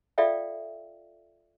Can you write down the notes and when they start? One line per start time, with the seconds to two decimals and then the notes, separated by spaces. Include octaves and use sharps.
0.18 F4 A4 D5 E5 F5 G5